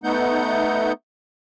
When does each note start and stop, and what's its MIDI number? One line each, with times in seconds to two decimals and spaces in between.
0.04 0.92 57
0.04 0.92 59
0.04 0.92 63
0.04 0.92 78
0.04 0.92 91